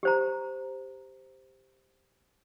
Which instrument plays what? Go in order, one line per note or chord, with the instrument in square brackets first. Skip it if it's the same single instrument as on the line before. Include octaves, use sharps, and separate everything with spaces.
[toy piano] G4 C5 A#5